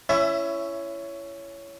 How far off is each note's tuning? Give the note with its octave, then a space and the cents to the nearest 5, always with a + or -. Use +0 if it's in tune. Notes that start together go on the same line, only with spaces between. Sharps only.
C#4 +10 E4 +30 E5 +10